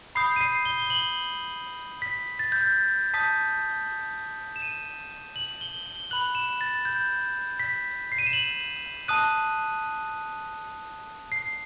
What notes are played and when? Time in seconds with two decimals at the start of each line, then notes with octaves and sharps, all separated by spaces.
0.15 B5 D#6 G6 C7
0.36 D#7
0.41 C7
0.65 G7
0.82 G7
0.90 F#7
2.02 B6
2.39 A6
2.52 G6
2.66 A6
3.14 A5 D#6 G6 B6
4.56 E7
4.62 D#7
5.36 F#7
5.61 G7
5.86 G7
6.11 B5 F#6 F#7
6.35 E7
6.61 A6
6.85 G6
7.60 B6
8.12 C7
8.18 D#7
8.27 E7
8.33 F#7
9.08 A5 D#6 F#6 D#7
11.32 C7